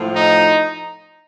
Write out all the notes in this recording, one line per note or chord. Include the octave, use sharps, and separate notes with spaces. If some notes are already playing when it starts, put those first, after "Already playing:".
Already playing: A2 F3
D#4